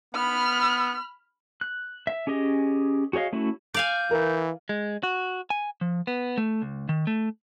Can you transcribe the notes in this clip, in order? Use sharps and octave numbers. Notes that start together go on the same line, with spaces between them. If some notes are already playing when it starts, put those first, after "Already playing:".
B3 B5 F6
F#6
E5
C#4 G4 G#4 D#5
F#4 G#4 C#5 D#5 F5
A3 C#4 E4 F#4
D5 F5 G#5 G6
E3 A#4
G#3
F#4
G#5
F3
B3
A3
C#2
D#3
A3